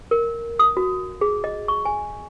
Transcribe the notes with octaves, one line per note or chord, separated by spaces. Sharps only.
A#4
D#6
F#4
G#4
D#5
C#6
G#5